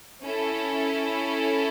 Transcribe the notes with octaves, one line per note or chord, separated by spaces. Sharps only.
C#4 E4 A4